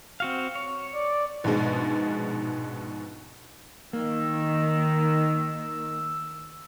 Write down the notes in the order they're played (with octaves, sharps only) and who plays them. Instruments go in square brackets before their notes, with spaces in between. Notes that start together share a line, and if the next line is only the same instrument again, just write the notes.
[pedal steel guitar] C4 F#4 F5
C#5
[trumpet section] D5
[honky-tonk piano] A#1 G#2 B2 G#3
[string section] D#3 [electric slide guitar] A#3 [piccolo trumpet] E6